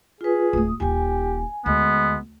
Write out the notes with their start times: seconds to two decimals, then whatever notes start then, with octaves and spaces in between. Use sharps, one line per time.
0.21 F4 G#4 B4
0.53 D1 A3 D#6
0.80 D#1 F4 G4 G#5
1.66 D2 G#3 B3